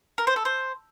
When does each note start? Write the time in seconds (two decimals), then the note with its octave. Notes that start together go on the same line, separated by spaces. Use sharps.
0.18 A#4
0.27 C5
0.36 A4
0.45 C5